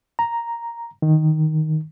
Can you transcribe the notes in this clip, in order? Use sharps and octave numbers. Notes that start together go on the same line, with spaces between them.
A#5
D#3